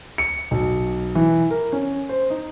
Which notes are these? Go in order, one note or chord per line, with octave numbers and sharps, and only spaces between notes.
C#7
B1
E3
A#4
C#4
C5
D#4